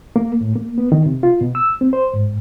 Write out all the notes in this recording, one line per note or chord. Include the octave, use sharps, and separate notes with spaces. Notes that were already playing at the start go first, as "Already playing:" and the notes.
A#3
A2
A#3
B3
D#3
C3
F4
B2
E6
C4
C5
G#2